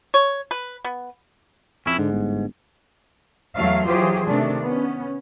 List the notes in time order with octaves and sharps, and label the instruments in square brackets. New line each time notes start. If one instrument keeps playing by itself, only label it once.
[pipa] C#5
B4
B3
[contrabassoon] F2 [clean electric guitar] C#4 E4
[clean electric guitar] G#2 [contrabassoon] D3
[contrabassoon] G1
[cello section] E2 F#3 A3 E5 F5
E3 F#3 F4 G4 G#4 C5
C3 D#3 A3 D4
B3 C#4